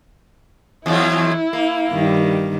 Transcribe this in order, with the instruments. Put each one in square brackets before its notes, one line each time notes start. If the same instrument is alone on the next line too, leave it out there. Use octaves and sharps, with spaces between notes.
[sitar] E2 F3 F#3 [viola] E4
[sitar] A#3
[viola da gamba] G2 D#3 G3